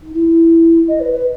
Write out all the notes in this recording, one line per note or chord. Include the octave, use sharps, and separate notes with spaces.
D#4
E4
D#5
B4
B4